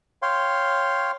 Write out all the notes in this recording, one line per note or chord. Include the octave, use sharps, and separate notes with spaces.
C#5 F5 G5 C6